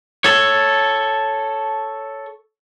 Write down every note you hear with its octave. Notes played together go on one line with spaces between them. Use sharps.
A4 C#5